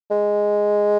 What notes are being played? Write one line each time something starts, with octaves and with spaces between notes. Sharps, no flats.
G#3